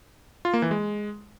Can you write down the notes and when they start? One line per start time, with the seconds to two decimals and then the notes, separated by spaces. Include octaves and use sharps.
0.45 F4
0.54 A#3
0.62 E3
0.71 G#3